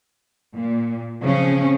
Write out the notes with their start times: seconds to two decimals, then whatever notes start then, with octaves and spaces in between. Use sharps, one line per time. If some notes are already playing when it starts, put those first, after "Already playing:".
0.54 A#2
1.22 C#3 F3 C4 C#4